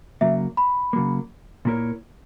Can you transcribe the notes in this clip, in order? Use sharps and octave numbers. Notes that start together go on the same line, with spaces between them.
C#3 F#3 A#3 E5
B5
C#3 F#3 A#3
A#2 A#3 E4 A#4 C#5